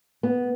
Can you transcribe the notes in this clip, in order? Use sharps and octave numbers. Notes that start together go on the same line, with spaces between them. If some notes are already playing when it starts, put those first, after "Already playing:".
B3